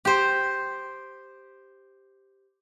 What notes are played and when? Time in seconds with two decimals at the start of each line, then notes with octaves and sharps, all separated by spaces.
0.05 G4 C5